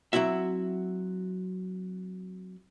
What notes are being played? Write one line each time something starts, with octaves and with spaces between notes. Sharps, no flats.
F#3 C4 E4 F#4 E5